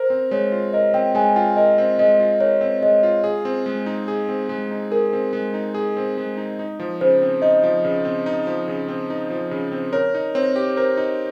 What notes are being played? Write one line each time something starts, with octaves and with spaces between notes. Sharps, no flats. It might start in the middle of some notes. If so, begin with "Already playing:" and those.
Already playing: A#4 C5
C4
G#3 C#5
F4
A#4 D#5
C4 G5
G#3 G#5
F4 G5
A#4 D#5
C4
G#3 D#5
F4
A#4 C#5
C4
G#3 D#5
F4
G#4
C4
G#3
D#4
G#4
C4
G#3
D#4
G#4 A#4
C4
G#3
D#4
G#4
C4
G#3
D#4
D#4
F3
C#3 C5
C4
D#4 D#5
F3
C#3
C4
D#4
F3
C#3
C4
D#4
F3
C#3
C4
A#4 C#5
D#4
C4 C#5
G4
A#4 C5
D#4